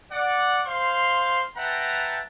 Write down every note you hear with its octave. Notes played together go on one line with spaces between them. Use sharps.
D5 F#5
C5 F5 C6
B4 E5 F#5 G5 A5 A#5